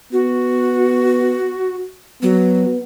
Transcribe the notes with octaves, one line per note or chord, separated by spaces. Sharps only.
B3 F#4
F#3 B3